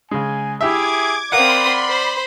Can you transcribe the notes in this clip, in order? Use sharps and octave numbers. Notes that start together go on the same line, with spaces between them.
C#3 G#3 G#5
E4 G4 G#4 E5 D6 G#6
C4 A#4 D5 F5 F#5 B5 C6 D#6
C5